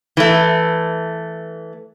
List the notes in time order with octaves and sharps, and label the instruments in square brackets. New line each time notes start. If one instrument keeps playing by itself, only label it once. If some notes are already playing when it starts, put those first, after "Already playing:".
[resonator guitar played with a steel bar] E3 A3